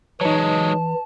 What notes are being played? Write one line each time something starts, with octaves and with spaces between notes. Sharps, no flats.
E3 F#3 G#3 D#4 C#5 A5